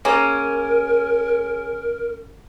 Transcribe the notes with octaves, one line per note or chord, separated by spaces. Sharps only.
A#3 C#4 G#4 A#4 C#5 G#5